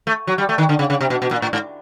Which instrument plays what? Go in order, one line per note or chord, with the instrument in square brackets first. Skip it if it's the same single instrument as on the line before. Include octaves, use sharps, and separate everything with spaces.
[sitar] A3
F#3
G3
A3
D#3
D3
C#3
C#3
C3
B2
B2
A#2
A2
G#2